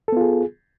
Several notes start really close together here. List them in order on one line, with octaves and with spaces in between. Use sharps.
A4 B3 F4 G#4